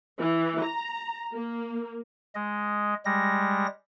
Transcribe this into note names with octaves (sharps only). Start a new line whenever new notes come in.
E3
A#5
A#3
G#3 D#5
G3 G#3 A#6